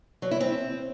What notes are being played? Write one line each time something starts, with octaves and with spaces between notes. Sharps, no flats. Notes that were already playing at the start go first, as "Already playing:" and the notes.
F#3
E4
C4